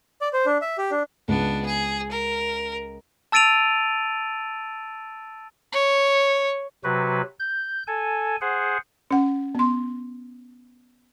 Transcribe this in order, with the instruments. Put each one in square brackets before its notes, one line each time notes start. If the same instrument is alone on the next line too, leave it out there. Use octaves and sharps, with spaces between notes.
[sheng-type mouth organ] D5
C5
D4
E5
G4
D4
[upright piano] C#2 [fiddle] B3 D4
[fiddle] G#4
A#4
[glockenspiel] A5 E6 A6 D7 D#7 F7
[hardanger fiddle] C#5
[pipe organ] C3 F#3 F#4 B4
G6
A4 G#5
G#4 C5 F#5
[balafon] C#4 F#5
B3 C6